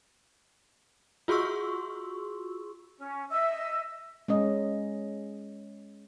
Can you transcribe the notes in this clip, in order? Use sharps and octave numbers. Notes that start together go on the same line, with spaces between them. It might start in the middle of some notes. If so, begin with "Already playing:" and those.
F4 F#4 G#4 C6 C#6 E6
C#4
D#5 E5 E6
G#3 C#4 D#5